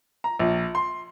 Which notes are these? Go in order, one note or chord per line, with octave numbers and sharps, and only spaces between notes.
A#5
A#1
C6